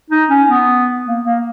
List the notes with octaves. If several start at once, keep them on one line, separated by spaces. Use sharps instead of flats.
D#4
C#4
B3
A#3
A#3